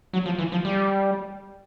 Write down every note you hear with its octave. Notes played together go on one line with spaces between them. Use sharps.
F#3
F3
E3
F3
G3